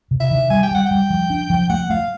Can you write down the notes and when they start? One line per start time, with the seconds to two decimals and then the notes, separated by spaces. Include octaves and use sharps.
0.11 C3
0.20 E5
0.31 D#3
0.50 G3 G#5
0.63 G5
0.71 G3 F#5
0.86 G3 G5
1.10 F3
1.30 D4
1.50 F3
1.69 A3 F#5
1.90 A3 F5